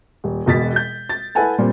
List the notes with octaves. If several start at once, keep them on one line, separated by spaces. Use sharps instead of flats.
D#1
E1 B2 A6 B6
G6
A6
E4 A4 B4 F#5 G#5 A5
A#2 G3 C4